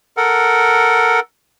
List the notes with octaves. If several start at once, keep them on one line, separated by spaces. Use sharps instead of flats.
A4 A#4 F#5